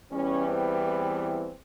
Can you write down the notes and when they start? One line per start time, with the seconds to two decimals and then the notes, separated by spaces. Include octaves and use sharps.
0.12 E2 E3 G3 C#4
0.47 C4
0.82 C4